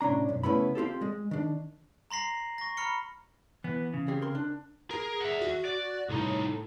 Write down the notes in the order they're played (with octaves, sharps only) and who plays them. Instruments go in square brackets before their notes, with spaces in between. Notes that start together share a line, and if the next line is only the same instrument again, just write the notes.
[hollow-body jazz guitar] A2 C3 C#4 D4 A#5
B1 F#2
C#3 A3 B3 C#4 E4 B5
C4 F4 G4 A4
G#3
D#3 D4
[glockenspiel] A#5 C6 A#6 C7 F#7
C#6 A#6
A#5 B5 F6 C#7 G7
[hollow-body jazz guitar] E3 [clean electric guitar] B3
[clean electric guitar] C#3
[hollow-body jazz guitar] C4 G4 G#4
A#4 C6
D4
[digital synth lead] G#4 [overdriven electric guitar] A#4
[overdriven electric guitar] E5 F#5
[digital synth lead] F#4
[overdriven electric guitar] D5
[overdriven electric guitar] C2 D#4 [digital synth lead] A2